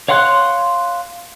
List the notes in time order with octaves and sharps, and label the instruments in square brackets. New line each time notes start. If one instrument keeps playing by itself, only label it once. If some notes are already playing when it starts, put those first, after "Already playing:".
[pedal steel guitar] C#5 F5 F#5 C6 F#6